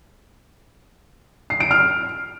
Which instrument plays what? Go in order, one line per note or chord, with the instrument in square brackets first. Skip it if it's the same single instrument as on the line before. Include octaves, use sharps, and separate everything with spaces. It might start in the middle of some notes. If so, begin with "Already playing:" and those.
[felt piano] C7
D7
F6